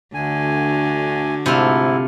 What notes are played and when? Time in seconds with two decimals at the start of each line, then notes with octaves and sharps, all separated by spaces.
0.14 D2 D3 F#4 G#5
1.46 G#2 C3 A3 E4 F4